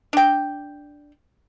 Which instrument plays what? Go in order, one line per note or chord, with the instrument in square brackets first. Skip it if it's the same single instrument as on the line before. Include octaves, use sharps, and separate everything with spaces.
[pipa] D4 G5